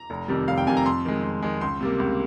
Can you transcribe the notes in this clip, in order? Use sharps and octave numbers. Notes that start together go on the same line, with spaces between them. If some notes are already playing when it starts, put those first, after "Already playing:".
Already playing: A#5
F1
F2 C3 D#3 G3
F1 F5
G5
F2 C3 D#3 G3 G#5
A#5
F2 C6
D#3 G#3
F2
D#3 G#3
C#2 C6
C3 G3 A#3
C#2